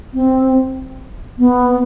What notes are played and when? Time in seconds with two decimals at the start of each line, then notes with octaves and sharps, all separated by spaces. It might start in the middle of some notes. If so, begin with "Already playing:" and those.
0.14 C4
1.38 B3